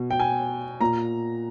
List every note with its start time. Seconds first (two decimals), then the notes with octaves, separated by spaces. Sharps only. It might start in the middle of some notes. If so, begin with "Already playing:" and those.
Already playing: B2
0.11 G5
0.20 G#5
0.81 A#2 A#5